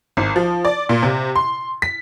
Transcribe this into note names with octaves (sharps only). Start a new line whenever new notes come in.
G#1
F3
D5
A#2
C3
C6
B6